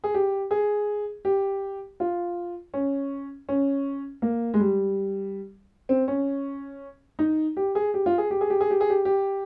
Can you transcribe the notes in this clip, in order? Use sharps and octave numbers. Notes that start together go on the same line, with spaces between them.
G#4
G4
G#4
G4
F4
C#4
C#4
A#3
G#3
G3
C4
C#4
D#4
G4
G#4
G4
F4
G#4
G4
G#4
G4
G#4
G4
G#4
G4
G4